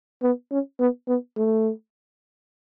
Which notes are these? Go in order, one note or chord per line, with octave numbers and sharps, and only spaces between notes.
B3
C#4
B3
B3
A3